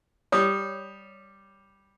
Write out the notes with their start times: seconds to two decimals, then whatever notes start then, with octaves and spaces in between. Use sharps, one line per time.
0.32 G3 C#5 D#6